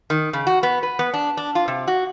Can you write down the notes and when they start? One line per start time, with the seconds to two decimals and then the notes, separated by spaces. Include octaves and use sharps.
0.10 D#3
0.33 C#3
0.47 F#4
0.63 B3
0.83 B4
0.99 B3
1.14 D4
1.37 D4
1.55 F4
1.68 C3
1.88 F#4